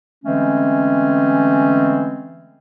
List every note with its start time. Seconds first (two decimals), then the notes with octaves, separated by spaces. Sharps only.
0.25 D3 E3 G#3 A3 C4 C#4